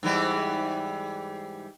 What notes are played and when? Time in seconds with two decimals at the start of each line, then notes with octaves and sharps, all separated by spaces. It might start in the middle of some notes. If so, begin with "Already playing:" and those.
0.03 G#2 E3 G3